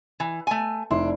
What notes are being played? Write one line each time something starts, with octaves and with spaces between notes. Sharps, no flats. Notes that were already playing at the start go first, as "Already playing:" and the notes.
E3
A3 G#5
F1 D4 E4 C6